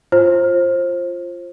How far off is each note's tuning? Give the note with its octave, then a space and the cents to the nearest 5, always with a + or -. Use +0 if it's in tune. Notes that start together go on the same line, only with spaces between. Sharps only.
F4 -10 C5 +25